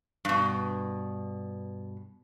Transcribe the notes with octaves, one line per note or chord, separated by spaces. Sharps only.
G2 B2